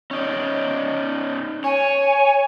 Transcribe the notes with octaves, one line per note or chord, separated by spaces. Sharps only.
C#4 D#4 D5
C#5 G#5